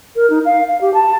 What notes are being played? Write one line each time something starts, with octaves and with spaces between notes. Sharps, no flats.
A#4
D#4
F5
F5
G4
A5